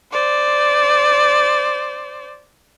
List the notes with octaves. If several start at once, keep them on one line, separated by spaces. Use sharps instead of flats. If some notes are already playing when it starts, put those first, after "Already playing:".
C5 D5